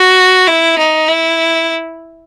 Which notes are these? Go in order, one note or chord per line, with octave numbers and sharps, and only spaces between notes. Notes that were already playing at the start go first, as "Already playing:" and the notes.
Already playing: F#4
E4
D#4
E4